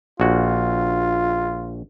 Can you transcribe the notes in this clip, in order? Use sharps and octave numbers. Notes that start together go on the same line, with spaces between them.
A#1 F4 F#4